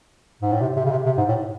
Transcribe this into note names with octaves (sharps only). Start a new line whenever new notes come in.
G#2
A2
C3
C3
C#3
C3
C3
G#2
A2